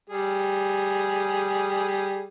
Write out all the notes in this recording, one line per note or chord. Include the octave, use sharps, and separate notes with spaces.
G3 G#4